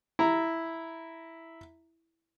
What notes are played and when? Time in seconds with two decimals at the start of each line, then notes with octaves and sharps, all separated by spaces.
0.19 E4 A#5